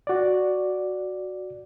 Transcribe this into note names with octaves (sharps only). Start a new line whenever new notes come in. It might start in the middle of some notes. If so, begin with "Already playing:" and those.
F#4 D5